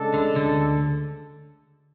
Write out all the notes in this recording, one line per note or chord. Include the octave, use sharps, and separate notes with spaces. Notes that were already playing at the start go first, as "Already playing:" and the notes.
Already playing: C#3 G#3 D4 A4
D2 D3
D2 D3